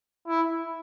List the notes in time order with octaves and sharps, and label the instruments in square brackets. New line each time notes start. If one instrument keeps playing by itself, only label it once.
[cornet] E4